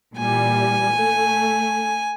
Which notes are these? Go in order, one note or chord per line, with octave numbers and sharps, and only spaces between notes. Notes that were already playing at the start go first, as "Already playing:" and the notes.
A#2 E3 G3 G#5
A3